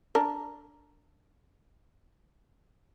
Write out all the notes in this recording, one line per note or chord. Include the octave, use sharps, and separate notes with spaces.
D4 A#4